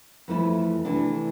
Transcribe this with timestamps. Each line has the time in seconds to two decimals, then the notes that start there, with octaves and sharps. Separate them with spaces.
0.28 F2 E3 A3 E4
0.85 C3 E3 A3 D4